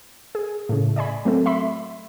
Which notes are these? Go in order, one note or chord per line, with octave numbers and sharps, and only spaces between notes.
G#4
A2 C#3
D5 D#5 G#5 B5
F#3 A3 C4 F#4 A4
E5 B5 C6